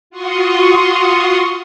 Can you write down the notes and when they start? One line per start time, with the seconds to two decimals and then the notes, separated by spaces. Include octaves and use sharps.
0.10 F4 F#4 C6 C#6 D#6